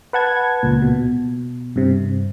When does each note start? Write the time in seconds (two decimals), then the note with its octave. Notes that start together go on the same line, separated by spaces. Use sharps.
0.13 B4 F#5 A5 G#6
0.63 C#2 A#2
0.82 B2
1.76 G2 C3